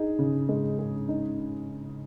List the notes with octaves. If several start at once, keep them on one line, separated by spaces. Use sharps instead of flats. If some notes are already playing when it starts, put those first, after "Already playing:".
Already playing: D#4 G#4
C#3
G#3
G#4
D#4